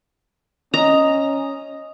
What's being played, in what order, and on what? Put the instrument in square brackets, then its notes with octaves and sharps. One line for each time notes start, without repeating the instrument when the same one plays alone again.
[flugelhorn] C#4 [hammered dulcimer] D#5 [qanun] A#5